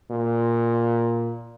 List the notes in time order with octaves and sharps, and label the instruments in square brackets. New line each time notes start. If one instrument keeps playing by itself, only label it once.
[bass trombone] A#2